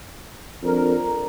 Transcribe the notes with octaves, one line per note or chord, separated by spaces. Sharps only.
F2 F3 D4 A#4